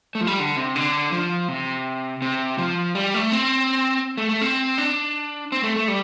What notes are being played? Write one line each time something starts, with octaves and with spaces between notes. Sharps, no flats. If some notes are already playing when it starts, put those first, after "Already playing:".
A3
F3
G3
D3
C3
D3
F3
C3
C3
F3
G3
A3
C4
A3
A3
C4
D4
C4
A3
A3
G3